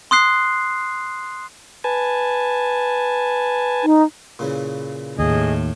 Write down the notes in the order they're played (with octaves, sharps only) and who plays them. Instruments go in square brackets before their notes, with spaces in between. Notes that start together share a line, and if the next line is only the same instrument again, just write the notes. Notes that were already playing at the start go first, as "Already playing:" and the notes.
[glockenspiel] C6 D#6 F#6 C7
[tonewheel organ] B4 G#5 A5
[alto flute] D#4
[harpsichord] A#2 C#3 E3
[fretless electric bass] D#2 [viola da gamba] A2 [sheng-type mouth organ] G#4 D#5